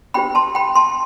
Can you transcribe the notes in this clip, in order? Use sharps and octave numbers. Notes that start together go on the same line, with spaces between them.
D4 G4 C5 G5 B5
A5 C6
G5 B5
A5 C6